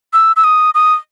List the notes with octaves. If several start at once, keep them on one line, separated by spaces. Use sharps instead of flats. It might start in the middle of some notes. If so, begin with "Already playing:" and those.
E6
E6
D#6
D#6